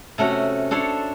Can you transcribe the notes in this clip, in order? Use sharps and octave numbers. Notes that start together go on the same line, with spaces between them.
C3 A3 C#4 F#4
D4 A4 C5 C#5